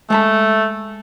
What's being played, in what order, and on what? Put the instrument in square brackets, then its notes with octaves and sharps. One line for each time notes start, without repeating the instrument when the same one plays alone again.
[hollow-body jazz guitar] G#3 A5 B5 [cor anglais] A3